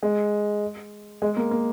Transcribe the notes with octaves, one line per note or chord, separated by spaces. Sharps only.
G#3
G#3
A#3
A#3